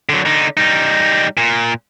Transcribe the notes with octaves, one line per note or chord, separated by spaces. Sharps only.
D3 F#3
D3 D#4
G3 D#4
A#2